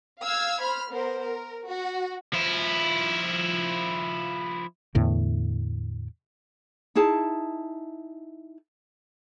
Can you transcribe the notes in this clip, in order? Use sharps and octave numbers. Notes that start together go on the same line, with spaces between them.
F5 E6 F6 G#6
C5 B5 F6
B3 A#4 C5
A#4
F#4
F3 E4
E2 A2 D3
D#4 E4 G#4 A5